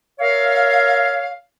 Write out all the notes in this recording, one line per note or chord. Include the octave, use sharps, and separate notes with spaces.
A#4 C#5 E5 F5